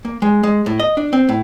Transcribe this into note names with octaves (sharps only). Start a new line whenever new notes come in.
A#3
G#3
G#3
A2
D#5
D4
C4
A2